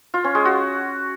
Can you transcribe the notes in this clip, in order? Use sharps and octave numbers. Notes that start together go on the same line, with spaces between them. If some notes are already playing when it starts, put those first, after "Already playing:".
F4
C#4
G#3
F#4